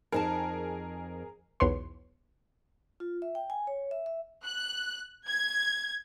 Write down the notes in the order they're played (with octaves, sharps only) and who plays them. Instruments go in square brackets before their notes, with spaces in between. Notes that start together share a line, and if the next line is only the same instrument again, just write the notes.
[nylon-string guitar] F2 D#4 A5 [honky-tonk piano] G#4 A#4
[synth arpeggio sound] B1 E2 B4 C#5 C6
[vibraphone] F4
E5
G5
G#5
C#5
E5
E5
[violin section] F#6
G#6